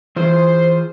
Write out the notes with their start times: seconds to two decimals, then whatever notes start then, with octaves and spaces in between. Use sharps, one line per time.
0.16 E3 F4 G#4 C5